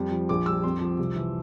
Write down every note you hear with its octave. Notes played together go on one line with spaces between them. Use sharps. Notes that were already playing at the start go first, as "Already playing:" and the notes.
Already playing: F2 G3
F3
A#1 D6
G3 E6
F2 C6
F3
C2
E3